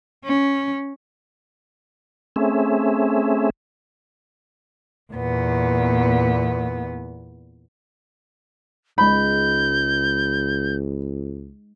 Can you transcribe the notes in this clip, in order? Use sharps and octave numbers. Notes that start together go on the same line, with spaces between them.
C#4
A3 C4 C#4 G#4 E5
E2 A#2 B3
C#2 G#3 D#4 B5 G6